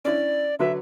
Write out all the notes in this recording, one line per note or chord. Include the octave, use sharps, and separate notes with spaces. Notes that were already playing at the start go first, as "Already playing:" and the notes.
C#4 D4 E4 D5
D3 F#3 B4 E5